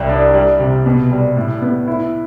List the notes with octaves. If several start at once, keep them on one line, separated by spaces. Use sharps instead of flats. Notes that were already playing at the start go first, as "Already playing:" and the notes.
Already playing: C2 G3
D4
G3
C3
B2
G3
A2
B3
E4